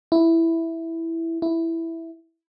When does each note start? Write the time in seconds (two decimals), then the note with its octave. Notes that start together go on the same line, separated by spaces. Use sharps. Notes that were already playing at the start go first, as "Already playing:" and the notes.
0.12 E4
1.42 E4